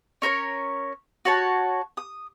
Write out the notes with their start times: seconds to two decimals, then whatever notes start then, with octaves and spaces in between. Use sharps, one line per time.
0.22 C#4 A#4 C5 C#5
1.25 F#4 C#5 A5
1.97 D#6